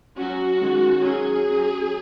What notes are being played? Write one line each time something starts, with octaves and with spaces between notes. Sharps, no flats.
F#3 C#4 F#4
D#3 G#3 C#4
F#3 C#4 G#4
F#3 C#4